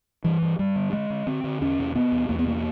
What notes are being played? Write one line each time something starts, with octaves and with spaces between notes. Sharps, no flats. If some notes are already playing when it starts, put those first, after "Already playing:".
G2 E3
G2
G2 G3
D3
D3 G#3
D3
D3 C4
D3
E2 C#4
C3
C3 B3
E2
E2 A#3
B3
C3 A#3